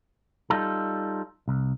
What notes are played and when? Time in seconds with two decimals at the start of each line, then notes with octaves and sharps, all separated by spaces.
0.50 G3 D#4 F4 A4
1.48 C2